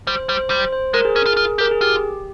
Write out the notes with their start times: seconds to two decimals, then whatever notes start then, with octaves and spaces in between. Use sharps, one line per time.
0.07 G3 C5
0.29 G3 C5
0.50 G3 C5
0.72 C5
0.94 G#3 A#4
1.05 G#4
1.16 C#4 A#4
1.26 F4 G#4
1.37 F4
1.59 G4 A#4
1.71 G#4
1.81 F4 G4